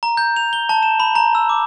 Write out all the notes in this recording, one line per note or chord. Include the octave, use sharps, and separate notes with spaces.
A#5
G6
F7
G7
A5
E7
B5
A#5
E6
D6